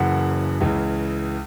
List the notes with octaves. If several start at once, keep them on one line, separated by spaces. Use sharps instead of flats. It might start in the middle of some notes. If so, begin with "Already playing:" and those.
Already playing: F#1 F#2 C#3 E3 F#5
C#2 C#3 E3